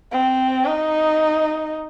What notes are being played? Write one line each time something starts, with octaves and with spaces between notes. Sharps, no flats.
C4
D#4